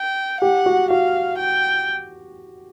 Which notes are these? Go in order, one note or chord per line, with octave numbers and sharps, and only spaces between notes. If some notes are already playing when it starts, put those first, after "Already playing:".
Already playing: G5
G4 F#5
F#4
F#4 F5
G5